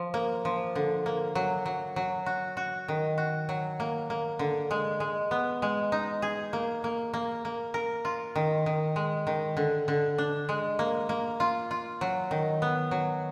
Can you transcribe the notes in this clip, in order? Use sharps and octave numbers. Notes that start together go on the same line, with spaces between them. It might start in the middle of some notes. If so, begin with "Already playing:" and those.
Already playing: F3
A#3
F3
D3
A#3
F#3
F#3
F#3
F#4
F#4
D#3
F#4
F#3
A#3
A#3
D3
G#3
G#3
B3
G#3
D#4
G#4
A#3
A#3
A#3
A#3
A#4
F4
D#3
D#3
G#3
D#3
D3
D3
D4
G#3
A#3
A#3
F4
F4
F#3
D#3
B3
F#3